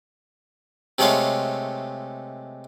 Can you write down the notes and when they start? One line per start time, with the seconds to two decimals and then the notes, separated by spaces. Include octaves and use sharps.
0.98 C3 G#3 A3 A4 C#5 F5